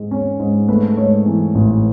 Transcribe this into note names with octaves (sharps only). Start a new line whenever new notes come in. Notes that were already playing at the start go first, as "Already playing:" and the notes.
Already playing: G#2 G#3
C#4
G#2
A3 B4
G#2 C#5
E3
A1